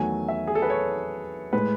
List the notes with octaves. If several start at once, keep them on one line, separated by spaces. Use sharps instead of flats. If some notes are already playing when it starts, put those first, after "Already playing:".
Already playing: E2 D#3 F#3 A3 G#5
E5
G#4
A4
B4
C#5
A2 G#3 B4